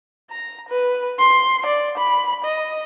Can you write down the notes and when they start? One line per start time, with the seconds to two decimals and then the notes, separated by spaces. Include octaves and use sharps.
0.30 A#5
0.69 B4
1.19 C6
1.66 D5
1.98 B5
2.45 D#5